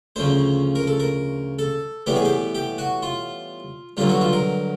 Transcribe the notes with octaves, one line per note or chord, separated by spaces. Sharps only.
D2 C#3 F3 C5
A#4
A4
A#4
A4
A2 E3 G3 B3 G4
G#4
G4
G4
F#4
F4
G2 D3 F#3 F4
F#4
F4
A#4